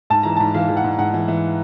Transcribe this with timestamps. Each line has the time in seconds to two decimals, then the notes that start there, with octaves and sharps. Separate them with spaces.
0.10 G#2 A5
0.23 E3 A#5
0.37 A5
0.40 G#2
0.54 E3 F5
0.69 E3
0.77 F#5
0.84 G#2
0.99 G#2 F#5
1.14 E3
1.28 E3